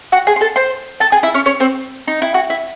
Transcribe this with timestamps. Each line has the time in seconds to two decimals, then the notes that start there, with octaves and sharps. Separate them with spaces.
0.12 F#4 F#5
0.27 G#4 G#5
0.36 C6
0.41 A4 A5
0.56 C5 C6
1.00 A4 A5
1.12 G#4 G#5
1.23 E4 E5
1.34 C#4 C#5
1.46 C#4 C#5
1.60 C4 C5
2.08 D#4
2.22 E4
2.34 F#4
2.50 E4